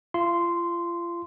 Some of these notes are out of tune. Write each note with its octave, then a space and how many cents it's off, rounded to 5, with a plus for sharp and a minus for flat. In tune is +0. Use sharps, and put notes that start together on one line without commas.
F4 -35 C6 -10